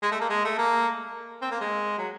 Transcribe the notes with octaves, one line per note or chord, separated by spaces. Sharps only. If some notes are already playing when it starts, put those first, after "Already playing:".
G#3
A3
A#3
G#3
A3
A#3
C4
A#3
G#3
F#3